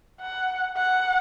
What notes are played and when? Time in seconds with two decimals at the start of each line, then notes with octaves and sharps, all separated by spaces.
0.21 F#5
0.77 F#5